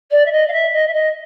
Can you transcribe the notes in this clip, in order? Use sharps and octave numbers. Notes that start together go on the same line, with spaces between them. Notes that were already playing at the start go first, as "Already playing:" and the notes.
D5
E5
D#5
F5
E5
D#5
E5
D#5